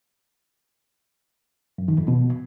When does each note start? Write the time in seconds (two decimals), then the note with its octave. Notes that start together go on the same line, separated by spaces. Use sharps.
1.78 F#2
1.88 D#3
1.98 F2
2.08 B2